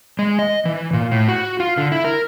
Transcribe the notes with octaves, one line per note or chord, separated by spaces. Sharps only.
G#3
D#5
E3
A#2
A2
F#4
F4
D3
E4
A#4